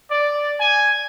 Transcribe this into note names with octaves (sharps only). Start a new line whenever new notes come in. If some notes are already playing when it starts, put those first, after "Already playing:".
D5
G#5